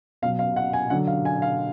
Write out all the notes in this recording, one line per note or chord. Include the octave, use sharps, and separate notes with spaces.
B2 F#3 F5
F5
F#5
G#5
D3 F#3 F#5
F5
G#5
F5